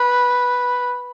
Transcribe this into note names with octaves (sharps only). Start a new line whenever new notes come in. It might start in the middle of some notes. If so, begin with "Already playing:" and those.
Already playing: B4